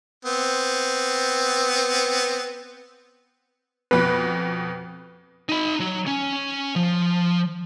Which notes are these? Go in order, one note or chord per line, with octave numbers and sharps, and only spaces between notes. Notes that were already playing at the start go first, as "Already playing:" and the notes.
B3 C4
F2 B2 B4
D#4 B5
F#3
C#4
F3